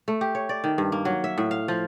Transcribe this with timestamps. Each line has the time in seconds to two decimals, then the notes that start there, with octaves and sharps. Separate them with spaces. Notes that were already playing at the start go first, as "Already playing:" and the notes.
0.08 A3
0.21 G4
0.35 C#5
0.49 D5
0.64 D#3
0.78 G2
0.92 A#3
1.05 F#3
1.24 E5
1.38 A2
1.51 F5
1.68 F3